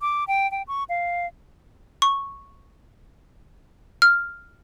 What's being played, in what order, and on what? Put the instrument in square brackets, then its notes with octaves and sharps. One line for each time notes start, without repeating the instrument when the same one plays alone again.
[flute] D6
G5
G5
C#6
F5
[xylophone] C#6
F6